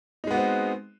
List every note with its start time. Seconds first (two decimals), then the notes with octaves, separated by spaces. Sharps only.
0.24 D#4
0.27 G#3
0.31 B3
0.34 F#4
0.37 C4